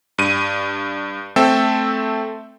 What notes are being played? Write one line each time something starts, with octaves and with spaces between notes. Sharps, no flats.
G2 D#7
A3 C4 A4 E5 G5